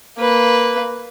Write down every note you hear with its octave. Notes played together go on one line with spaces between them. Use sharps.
A#3 B4